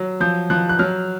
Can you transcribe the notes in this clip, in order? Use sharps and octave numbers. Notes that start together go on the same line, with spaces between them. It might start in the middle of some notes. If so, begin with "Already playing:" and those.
Already playing: F#3
F3 G6
F3 F#6
F#6
F#3 F6